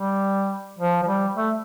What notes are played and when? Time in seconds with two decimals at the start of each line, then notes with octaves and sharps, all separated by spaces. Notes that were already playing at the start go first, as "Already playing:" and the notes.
Already playing: G3
0.79 F3
1.03 F3
1.07 G3
1.36 A3